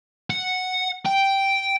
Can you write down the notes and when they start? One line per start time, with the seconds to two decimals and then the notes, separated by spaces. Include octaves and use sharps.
0.30 F#5
1.06 G5